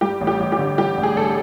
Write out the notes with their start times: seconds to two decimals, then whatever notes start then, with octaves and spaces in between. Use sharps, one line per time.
0.01 G2 G4
0.21 A1
0.27 G4
0.40 A1
0.52 G4
0.59 D3
0.78 G2 G4
0.97 A1
1.03 G#4
1.16 A1 A4